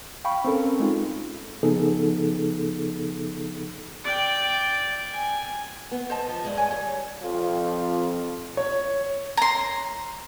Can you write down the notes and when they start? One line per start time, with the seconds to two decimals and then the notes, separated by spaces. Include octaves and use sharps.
0.25 F5 G5 B5 C#6
0.45 C4 C#4 A4 A#4
0.80 G#3 D#4 F4
1.63 C#3 F3 B3 D#4 G#4 A4
4.04 D5 G5
5.12 G#5
5.92 B3
6.10 C5 D#5 A5
6.28 F3
6.45 G2 G#3
6.57 C#5 G#5
6.71 G3 C#5
7.23 F2 F4
8.57 C#5
9.37 A#5 C6